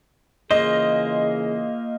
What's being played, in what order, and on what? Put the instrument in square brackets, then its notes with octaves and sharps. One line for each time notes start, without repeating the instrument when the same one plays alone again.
[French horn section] C#3 E3 G#4 [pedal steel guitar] A#3 F4 C5 [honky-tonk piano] D#5